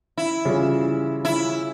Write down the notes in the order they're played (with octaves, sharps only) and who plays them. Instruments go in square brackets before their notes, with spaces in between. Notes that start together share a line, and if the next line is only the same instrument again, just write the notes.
[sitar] E4
[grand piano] C#3 E3 G3 C#4 F4
[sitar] E4